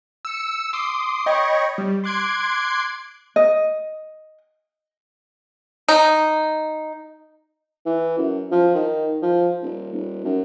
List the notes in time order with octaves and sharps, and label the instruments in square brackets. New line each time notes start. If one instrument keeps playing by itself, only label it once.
[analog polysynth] E6 C#7
C6 D6 D#6 C7
C#5 D#5 G5 B5 C#6
G3
C6 D6 F#6 G#6 C7 D7
[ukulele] D#5
[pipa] D#4
[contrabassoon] E3
F#2
F3
D#3
F3
D#1
D#1
F#2